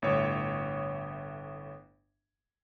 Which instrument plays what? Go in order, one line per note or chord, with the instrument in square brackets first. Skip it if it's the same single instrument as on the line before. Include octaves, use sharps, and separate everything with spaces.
[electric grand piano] G1 A2 C#5